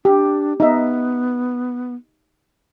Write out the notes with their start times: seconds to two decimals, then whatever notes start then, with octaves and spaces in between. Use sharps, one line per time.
0.05 D4 G4
0.60 B3 D#4 E5